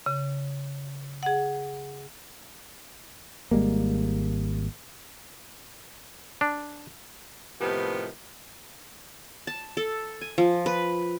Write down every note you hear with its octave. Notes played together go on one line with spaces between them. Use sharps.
C#3
G#4 F#5
G#1 G3 G#3 A#3
D4
A2 C3 D#3 F3 B3 G4
A5
A4
G#5
F3
B4